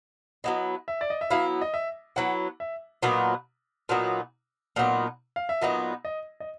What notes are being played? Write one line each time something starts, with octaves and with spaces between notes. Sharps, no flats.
F#3 B3 E4 D#5
E5
D5
D#5
E5
F#3 B3 E4 F5
D#5
E5
F#3 B3 E4 F#5
E5
A#2 F#3 B3 D#4
A#2 F#3 B3 D#4
A#2 F#3 B3 D#4
F5
E5
A#2 F#3 B3 D#4 D#5
D#5
D#5